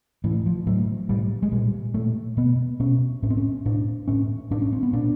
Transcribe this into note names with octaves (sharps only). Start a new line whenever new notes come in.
A2 E3
F3
A2 F#3
A2 G3
G#3
A#2 G3
A#2 A3
B2 B3
B2 C#4
A2 C#4
C4
C#4
A2 D4
A2 C#4
A2 D4
C#4
C4
B3
A#2 D4